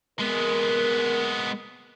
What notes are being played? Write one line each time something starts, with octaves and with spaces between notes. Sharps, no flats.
G#3 B3 A#4